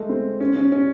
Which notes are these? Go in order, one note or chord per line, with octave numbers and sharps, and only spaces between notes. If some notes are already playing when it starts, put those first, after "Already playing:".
Already playing: G#3 A3
C4
C#4
C#4
C#4